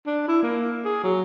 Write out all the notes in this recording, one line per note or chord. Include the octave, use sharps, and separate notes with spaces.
D4
E4
A#3
G#4
F#3